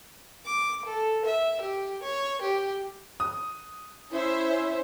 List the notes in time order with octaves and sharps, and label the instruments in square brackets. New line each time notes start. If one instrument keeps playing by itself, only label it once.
[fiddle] D6
A4
E5
G4
C#5
G4
[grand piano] D#6
[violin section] C#4 C5 E5 [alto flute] E4